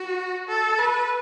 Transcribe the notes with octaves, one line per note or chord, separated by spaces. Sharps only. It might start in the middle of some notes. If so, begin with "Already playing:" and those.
Already playing: F#4
A4
B4